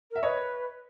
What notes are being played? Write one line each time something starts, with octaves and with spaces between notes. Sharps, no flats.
A#4 E5
B4 C#5 D#5